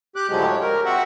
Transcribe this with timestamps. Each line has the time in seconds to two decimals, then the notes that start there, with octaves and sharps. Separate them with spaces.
0.16 G4 D6 F#6
0.29 A2 D3 F3 F#3 G#3 G4
0.47 C#5
0.62 A#4
0.85 C4 F#4 E5 F#5